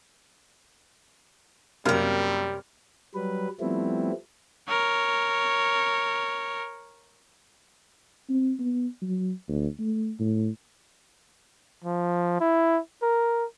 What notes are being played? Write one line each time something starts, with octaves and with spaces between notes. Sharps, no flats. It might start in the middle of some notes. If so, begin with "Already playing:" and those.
F#2 C3 G3 A#3 A#4 F6
F#3 G3 B4
F3 G3 A3 B3 C4 E4
A#4 C#5
C4
B3
F#3
D2
A3
A2
F3
E4
A#4